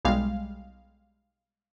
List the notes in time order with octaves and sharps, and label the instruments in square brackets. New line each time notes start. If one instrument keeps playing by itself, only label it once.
[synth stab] B1 G3 G#3 F5